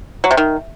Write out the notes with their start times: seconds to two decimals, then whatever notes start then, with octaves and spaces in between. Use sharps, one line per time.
0.24 F#3
0.31 C3
0.37 D#3